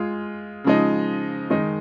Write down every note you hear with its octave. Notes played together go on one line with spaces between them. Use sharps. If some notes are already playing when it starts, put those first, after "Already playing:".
Already playing: G#3 F4 G#4
C#3 F3 G#3 D#4
D#3 G#3 D#4